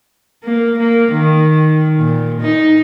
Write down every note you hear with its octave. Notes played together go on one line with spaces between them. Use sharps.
A#3
A#3
D#3
A#2
D#4